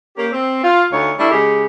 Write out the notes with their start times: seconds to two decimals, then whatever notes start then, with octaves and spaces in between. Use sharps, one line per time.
0.17 A#3 C#4 G4
0.32 C4
0.63 F4
0.92 D2 D#4 F4 C#5
1.19 G3 A3 D4 E4
1.31 C#3 G#3 G4 G#4